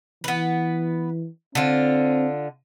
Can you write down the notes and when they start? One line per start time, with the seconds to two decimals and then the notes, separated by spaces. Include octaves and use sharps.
0.24 E3 B3 B4
1.55 D3 C4 F4